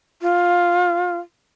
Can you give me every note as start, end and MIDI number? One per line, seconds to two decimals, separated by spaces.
0.22 1.18 65